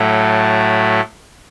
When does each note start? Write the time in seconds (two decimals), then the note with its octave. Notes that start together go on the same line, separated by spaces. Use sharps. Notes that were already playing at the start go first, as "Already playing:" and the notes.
Already playing: A2 F#3 A3